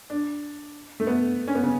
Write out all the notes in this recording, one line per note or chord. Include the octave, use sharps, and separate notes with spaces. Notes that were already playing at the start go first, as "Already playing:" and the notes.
D4
A3
B3
C#4
B3
C#3